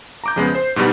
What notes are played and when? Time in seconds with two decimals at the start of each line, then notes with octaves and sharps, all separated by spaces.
0.24 A#5 D6 G6
0.36 F2 C#3 G#3 B3
0.55 C5
0.76 G#2 B2 G3 D#4